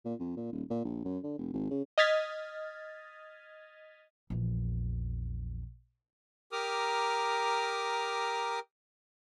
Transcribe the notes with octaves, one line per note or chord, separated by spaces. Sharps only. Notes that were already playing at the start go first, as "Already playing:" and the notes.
A#2
F2
A#2
D#1
A#2
A#1
F#2
D3
F1
G#1
C#3
D#5 D#6 F6 G#6 A6 B6
A#1 E2
G4 A#4 A#5 D6 D#6 F6